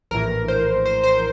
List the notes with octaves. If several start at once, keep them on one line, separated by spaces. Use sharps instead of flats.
A#1 A2 E3 A#4
C5
C5
C5